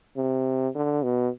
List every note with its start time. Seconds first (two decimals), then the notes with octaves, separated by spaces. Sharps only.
0.17 C3
0.75 D3
1.03 B2